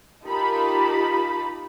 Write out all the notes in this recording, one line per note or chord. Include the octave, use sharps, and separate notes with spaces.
D#4 F4 G4 A#4 A5 B5